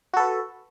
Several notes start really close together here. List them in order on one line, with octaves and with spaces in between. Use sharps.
F#4 A4 B4